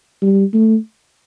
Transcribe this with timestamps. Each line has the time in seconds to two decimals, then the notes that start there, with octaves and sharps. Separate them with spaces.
0.22 G3
0.53 A3